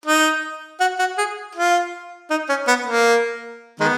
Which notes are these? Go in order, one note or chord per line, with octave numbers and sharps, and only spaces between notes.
D#4
F#4
F#4
G#4
F4
D#4
C#4
B3
A#3
D#3 G#3 B3